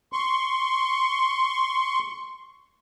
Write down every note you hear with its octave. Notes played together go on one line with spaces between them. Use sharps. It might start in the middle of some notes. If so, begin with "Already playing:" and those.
C6 C#6